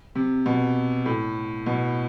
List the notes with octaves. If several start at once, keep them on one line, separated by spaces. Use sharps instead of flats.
C3
B2
A2
B2